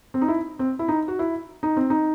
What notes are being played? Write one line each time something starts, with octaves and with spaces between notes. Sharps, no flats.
C4
D#4
E4
C4
E4
D#4
F#4
E4
D#4
C4
D#4